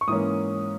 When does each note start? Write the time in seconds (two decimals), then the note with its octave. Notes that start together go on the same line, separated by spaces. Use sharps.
0.01 C#6
0.08 G#2 E3 A#3 C#4 D#6